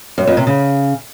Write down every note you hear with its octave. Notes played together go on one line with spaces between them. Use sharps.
F#2
F2
C3
C#3